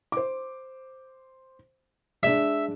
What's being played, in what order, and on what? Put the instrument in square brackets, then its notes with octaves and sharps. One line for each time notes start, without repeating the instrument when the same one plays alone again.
[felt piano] C5 D6
[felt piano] G#3 D4 [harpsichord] E5